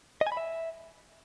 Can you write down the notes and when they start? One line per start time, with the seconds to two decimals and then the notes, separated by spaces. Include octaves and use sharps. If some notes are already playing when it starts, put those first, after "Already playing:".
0.21 D#5
0.27 G#5
0.32 B5
0.37 E5